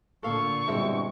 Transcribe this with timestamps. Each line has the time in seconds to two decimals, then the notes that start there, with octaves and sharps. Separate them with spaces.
0.23 A#2 D3 A4 F5 C#6
0.67 G2 B2 G3 G#3 C4 E4